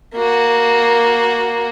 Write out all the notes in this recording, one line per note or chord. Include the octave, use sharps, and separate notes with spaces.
A#3 F#4